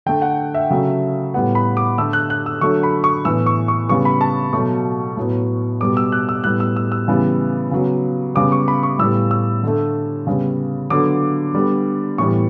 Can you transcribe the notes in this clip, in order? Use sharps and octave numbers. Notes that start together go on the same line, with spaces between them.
D3 A3 G5
F#5
E5
C#3 F#3 A3
A2 G3 B3 F#5
B5
D6
D3 A3 E6
F#6
F#6
E6
D3 F#3 A3 C#6
B5
C#6
A2 E3 B3 E6
C#6
C#6
C#3 G3 B3 C#6
B5
A5
B2 F#3 A3 C#6
A2 F#3 B3
B2 G3 B3 D6
E6
F#6
E6
A2 G3 B3 F#6
E6
E6
E6
C#3 E3 G3 B3
C#3 F#3 B3
C#3 G3 B3 D6
C#6
B5
C#6
A2 G3 B3 E6
E6
D3 A3
C#3 G3 B3
D3 F#3 B3 D6
D3 G3 B3
A2 E3 G3 B3 C#6